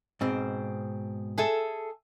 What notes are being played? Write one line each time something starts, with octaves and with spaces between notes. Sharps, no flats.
G#2 B2 C4
G#4 A4 E5